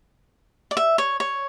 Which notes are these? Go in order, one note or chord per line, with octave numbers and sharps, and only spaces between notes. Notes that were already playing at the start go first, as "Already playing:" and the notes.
D5
E5
C#5
C#5